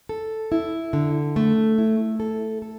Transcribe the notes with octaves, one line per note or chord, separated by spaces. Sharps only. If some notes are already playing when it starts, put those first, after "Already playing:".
A4
E4
D3
A3
E4
A4
A4